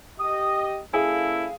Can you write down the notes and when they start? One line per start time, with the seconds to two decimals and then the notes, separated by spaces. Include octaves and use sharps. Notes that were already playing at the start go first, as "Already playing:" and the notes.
0.19 G4 D#5 D#6
0.94 A#3 C#4 E4 G#4 A4 F5